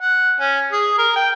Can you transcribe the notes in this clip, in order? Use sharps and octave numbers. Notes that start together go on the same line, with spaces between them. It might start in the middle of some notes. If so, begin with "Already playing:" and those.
F#5
C#4
G#4
A#4
G5